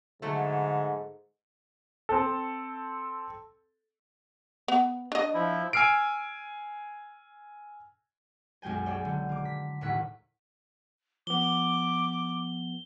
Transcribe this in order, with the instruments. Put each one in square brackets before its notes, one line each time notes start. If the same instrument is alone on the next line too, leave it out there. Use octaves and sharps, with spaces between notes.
[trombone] G#2 [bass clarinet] D3 [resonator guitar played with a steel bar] F#3 A3
[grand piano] C4 A4
[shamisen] B3
D4 D#5
[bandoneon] F3 E4
[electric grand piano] G#5 E6 F6 C7 D7
[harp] B1 F#2 G#3 G5 G#5
G#4 A4 C#5 D5 G5
D3
A#3 D6
B6
A1 D#2 A2 F#5 B6
[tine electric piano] F3 B3 [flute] D6 [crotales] G7